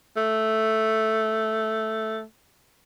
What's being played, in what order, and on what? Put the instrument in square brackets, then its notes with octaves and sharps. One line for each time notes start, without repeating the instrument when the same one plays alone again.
[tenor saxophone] A3